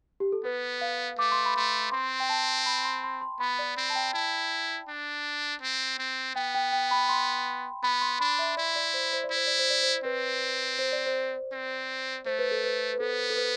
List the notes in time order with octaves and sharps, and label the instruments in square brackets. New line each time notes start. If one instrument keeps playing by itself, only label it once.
[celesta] G4
A4
[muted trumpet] B3 [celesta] B4
[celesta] F5
[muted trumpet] A3 [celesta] D6
[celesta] C6
B5
[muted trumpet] A3 [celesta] C6
[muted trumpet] C4 [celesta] C6
[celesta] G5
A5
B5
C6
C6
C6
[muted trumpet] B3 [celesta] B5
[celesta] D5
[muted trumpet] C4
[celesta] A5
G5
[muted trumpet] E4 [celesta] A5
[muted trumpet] D4
C4
C4
[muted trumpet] B3 [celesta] G5
[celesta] G5
G5
B5
C6
[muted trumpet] B3 [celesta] B5
[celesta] C6
[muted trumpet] D4 [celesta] B5
[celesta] E5
[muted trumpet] E4 [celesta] D5
[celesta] D5
C5
C5
D5
[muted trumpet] E4
[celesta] C5
D5
C5
D5
C5
[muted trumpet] C4 [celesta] B4
[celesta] C5
D5
C5
[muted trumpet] C4
[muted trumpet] A3 [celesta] C5
[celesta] B4
A4
B4
B4
[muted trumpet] B3 [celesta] A4
[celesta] A4
B4